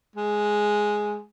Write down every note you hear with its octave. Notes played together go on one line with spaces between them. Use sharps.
G#3